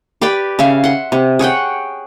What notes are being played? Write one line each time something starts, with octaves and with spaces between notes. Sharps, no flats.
G4 B4 D5 G5
C#3 E5 F5
F#5 C6
C3
G#4 C#5 F#5 G5